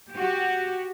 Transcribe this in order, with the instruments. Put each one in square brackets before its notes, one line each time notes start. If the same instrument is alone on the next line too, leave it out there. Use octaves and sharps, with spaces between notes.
[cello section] F#4 G4